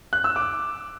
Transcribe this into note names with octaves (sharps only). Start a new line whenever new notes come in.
F#6
E6
D6